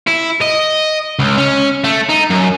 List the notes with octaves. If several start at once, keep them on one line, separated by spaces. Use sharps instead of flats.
E4
D#5
C#2
C#4
A3
D#4
F#2